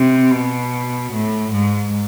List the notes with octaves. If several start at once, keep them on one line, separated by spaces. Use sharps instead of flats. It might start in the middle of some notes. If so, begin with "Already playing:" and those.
Already playing: C3
B2
A2
G#2